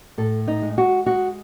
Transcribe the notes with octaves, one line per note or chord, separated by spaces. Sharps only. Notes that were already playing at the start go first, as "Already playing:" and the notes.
A2 A4
D#4
G#3
F#4
G#3 F#4